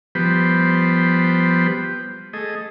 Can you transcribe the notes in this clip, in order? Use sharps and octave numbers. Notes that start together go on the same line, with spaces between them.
F3 G3 B3 G4 B4 C5
A3 G#4 D#5